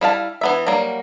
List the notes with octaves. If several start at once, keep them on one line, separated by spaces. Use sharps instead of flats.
G3 E4 F5 A5
E3 B3 E5
F#3 G3 A#3